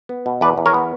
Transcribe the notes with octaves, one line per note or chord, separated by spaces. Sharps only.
B3
B2
E2 B4 D5
E2
A#4 C#5
B3